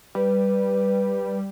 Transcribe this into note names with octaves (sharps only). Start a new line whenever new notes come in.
G3 B4